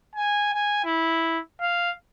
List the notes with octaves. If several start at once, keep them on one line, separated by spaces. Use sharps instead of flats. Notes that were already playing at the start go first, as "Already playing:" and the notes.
G#5
G#5
E4
F5